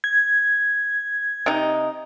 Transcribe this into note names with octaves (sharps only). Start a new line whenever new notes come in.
G#6
C3 D#4